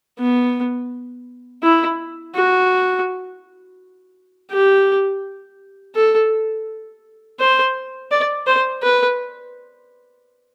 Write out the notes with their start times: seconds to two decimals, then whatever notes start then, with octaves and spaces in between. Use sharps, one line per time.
0.19 B3
1.63 E4
2.36 F#4
4.51 G4
5.95 A4
7.40 C5
8.11 D5
8.47 C5
8.83 B4